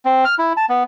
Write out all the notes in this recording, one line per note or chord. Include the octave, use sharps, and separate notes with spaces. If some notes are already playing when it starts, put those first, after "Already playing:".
C4
F6
E4
A5
B3